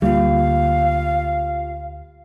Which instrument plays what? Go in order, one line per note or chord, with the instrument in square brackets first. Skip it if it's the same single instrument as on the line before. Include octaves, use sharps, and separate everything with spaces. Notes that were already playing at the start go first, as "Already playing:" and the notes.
[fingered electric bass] D2 G3 A#3 [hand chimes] F4 G4 [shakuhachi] F5